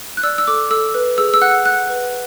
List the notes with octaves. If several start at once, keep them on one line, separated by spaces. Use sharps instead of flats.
F#6
D5 E6
E6
A4 D6
A4 E6
B4
G#4 E6
E6
F#5 F#6
F#5 F#6
B4